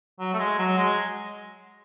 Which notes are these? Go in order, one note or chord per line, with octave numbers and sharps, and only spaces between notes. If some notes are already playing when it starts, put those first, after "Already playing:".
F#3
A3
G#3
F#3
G#3